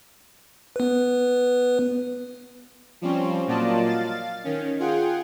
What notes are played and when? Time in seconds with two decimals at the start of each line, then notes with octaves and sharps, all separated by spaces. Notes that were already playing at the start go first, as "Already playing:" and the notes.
0.76 B3 B4
3.02 F3 G3 C4 C#4
3.47 A#2 F#3 F4 D5 D#5 A5
3.85 F5 A6
4.44 D#3 C#4
4.79 F4 G#4 F#5 G5